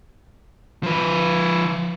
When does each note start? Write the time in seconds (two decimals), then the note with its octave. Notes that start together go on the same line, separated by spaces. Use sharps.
0.83 F3 B4